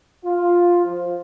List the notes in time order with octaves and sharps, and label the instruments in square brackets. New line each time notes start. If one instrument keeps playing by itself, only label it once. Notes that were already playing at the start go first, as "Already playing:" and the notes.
[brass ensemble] F4
F3